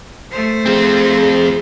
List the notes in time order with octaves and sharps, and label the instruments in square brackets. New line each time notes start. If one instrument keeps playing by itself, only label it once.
[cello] A3 C5
[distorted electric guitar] F3 C4 [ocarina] G#4